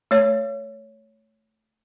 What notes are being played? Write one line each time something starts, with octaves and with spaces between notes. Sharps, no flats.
A3 C#5